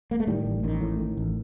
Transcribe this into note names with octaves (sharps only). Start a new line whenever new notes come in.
A#3
A3
A2 D#3 G3
A1
A1 D#3
A2
A2
A1